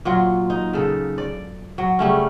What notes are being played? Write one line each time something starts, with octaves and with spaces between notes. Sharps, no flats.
A#2 F#3 F4
D#4
C#3 A4
D5
F#3
C#3 G3 A3 C#4